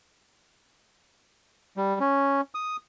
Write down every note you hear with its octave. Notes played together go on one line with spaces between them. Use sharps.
G3
C#4
D#6